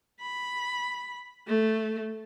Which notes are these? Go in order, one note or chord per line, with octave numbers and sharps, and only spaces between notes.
B5
A3